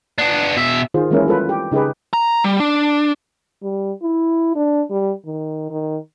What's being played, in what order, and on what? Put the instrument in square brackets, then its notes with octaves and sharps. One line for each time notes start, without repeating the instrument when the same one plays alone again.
[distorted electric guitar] B3 D4
B2 E5
[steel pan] D#3 F4 G#4 C5
E3 G#3 A#3 C#4 E4 A#4
G3 F4 A4 B4
G4
C#3 D#4 G4 G#4 B4
[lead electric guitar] A#5
G3
D4
[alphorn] G3
E4
D4
G3
D#3
D#3